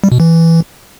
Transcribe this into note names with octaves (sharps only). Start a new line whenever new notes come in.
G3
B2
E3